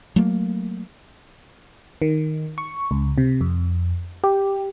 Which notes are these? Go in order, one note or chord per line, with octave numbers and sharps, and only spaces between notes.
F#3 A3 A#3
D#3
C#6
C#2
C3
F2
G4